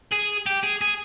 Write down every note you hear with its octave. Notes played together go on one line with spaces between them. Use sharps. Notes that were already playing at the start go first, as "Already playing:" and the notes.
G#4
G4
G#4
G#4